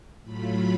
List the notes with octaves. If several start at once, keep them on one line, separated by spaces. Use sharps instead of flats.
A2 F#3 A3 F4 B5